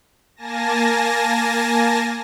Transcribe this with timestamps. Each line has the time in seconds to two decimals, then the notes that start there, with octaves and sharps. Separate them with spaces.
0.36 A#3 G#5 A5 A#6